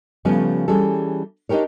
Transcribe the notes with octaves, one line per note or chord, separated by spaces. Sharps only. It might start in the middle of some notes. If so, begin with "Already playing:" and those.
C#3 F3 G3 A3 B3 C#4
E3 G3 C#4 G#4 A4
D4 D#4 F#4 G4 A#4 C#5